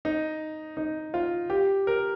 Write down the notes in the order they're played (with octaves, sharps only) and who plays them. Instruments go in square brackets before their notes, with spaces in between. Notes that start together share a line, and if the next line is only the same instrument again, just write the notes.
[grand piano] D#4
D#4
F4
G4
A#4